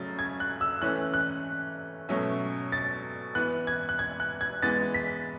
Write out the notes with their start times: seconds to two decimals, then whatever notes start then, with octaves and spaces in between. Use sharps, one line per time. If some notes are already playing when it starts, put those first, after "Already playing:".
Already playing: C#3 F#3 A3 A6
0.19 G#6
0.40 F#6
0.61 E6
0.82 E3 A3 C#4 F#6
1.14 F#6
2.09 B2 F#3 A3 C#4
2.72 A6
3.35 E3 B3 F#6
3.67 G#6
3.89 F#6
3.99 G#6
4.20 F#6
4.41 G#6
4.62 E3 G#3 B3 A6
4.94 B6